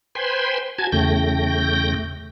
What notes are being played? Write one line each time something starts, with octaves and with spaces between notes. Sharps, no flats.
B4 C5 G5 G#5 B5 C6
F#4 G#5 A5 G#6
E2 C#3 A3 G5 G6 A#6